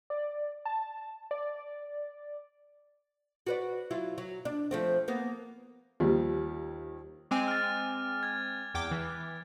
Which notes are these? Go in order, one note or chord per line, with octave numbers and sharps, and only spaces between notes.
D5
A5
D5
F#4 B4 D5
F#3 E4 F4
F#3
D4
F3 A3 C4
A#3 B3
D#2 F3 G3
G#3 C4 G#5 D6
F6 A6
F6 G#6
E2 G5 D6
E3